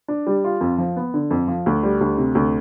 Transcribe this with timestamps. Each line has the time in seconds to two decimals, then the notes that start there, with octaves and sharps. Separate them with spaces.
0.08 D4
0.27 G3
0.44 F4
0.61 F2
0.78 F3
0.96 B3
1.14 D3
1.31 F2
1.48 F3
1.66 D2
1.83 G3
2.01 D2
2.18 C3
2.35 D2